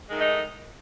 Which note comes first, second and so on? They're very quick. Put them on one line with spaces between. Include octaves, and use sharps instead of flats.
G#3 D#3 A3 D#4